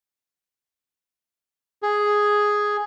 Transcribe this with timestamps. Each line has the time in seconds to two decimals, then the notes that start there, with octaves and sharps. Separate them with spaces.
1.83 G#4